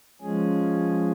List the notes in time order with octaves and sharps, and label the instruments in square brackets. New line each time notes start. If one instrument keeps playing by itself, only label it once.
[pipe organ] F3 G#3 C#4 G#4